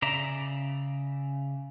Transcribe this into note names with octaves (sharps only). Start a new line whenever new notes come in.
C#3 D5 E5 A#5